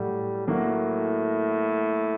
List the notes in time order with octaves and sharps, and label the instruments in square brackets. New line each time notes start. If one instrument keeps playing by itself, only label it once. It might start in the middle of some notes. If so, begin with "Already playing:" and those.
Already playing: [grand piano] A2 F#3 A3 [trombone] G3
[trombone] A2 [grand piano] F#3 A#3 F#4